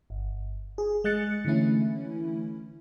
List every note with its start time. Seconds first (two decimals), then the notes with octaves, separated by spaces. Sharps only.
0.10 G1
0.78 G#4
1.04 G#3 D#5 F#6 A6 C#7
1.45 D3 E3 A3 C#4 E4